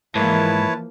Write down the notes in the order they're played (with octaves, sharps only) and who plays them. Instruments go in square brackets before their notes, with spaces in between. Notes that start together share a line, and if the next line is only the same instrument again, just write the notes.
[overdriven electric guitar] G#2 [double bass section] E3 F3 A#3 [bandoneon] E4 B4 C#5 [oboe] A5